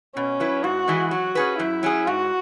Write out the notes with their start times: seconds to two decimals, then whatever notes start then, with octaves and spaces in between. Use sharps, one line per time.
0.16 B2 C#4
0.40 F#3 E4 B4
0.64 G#2 F#4
0.88 E3 G#3 E4
1.11 F#3 F#4
1.35 C#4 G#4 B4
1.59 F#2 E4
1.83 F#3 C#4 G#4
2.07 G#2 F#4